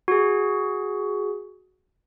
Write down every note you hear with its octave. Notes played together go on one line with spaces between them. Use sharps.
F#4 G#4